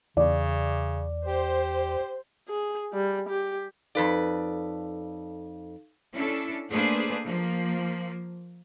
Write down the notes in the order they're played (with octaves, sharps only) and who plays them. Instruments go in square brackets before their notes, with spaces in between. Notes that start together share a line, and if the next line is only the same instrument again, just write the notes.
[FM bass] E2 [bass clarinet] C#3 [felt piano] D5
[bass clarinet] G4 [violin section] C5
[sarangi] G#4
G3
G4
[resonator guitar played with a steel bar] F2 B4 D5 [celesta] D#4 A4 F5
[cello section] C#4 D4 E4 A4
A3 A#3 D4 G#4 B4 C5
F3 A#3